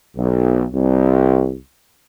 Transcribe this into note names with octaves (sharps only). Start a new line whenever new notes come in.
B1
C2